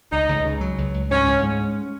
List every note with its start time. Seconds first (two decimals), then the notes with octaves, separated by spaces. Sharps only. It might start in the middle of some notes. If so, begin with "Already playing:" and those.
0.12 C#2 D#4
0.29 C#2
0.45 C#3
0.61 F#3
0.78 C#2
0.94 C#2
1.11 G#2 C#4
1.28 G#2
1.43 G#3
1.60 C#4